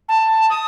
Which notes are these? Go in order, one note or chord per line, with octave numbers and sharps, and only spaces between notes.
A5
D#6